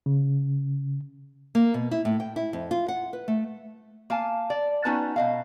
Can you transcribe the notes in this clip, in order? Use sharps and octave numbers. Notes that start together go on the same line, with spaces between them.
C#3
A#3
B2
E4
A2
G5
E4
F2
F4
F#5
B4
A3
A#3 F5 G#5 A5
D5
B3 C#4 D#4 F#4 B4 A5
B2 D#5 F5